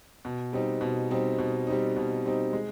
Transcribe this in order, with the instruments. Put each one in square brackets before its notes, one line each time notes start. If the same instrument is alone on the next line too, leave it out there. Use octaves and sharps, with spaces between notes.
[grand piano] B2
G3 C4 D#4
B2
G3 C4 D#4
B2
G3 C4 D#4
B2
G3 C4 D#4
G#3